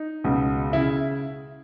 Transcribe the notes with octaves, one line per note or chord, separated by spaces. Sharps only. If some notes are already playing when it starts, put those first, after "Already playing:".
Already playing: D#4
C#2 B2
C#3 E4